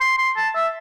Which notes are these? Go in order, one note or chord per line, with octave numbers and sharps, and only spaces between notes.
C6
C6
A5
E5